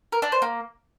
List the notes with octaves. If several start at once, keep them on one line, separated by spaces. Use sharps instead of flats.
A#4
D4
C5
A#3